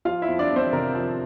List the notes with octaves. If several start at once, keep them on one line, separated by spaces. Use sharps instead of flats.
F3 F4 F5
E4 E5
F2
D4 D5
F2
C4 C5
C3 A#4
F3